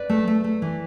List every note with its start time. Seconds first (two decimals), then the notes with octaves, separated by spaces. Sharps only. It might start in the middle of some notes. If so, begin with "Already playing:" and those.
Already playing: B4 D5
0.10 A3
0.28 A3
0.44 A3
0.62 E3